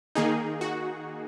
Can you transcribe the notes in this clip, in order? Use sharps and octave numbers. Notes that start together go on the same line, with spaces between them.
D#3 A#3 D#4 G#4
F#4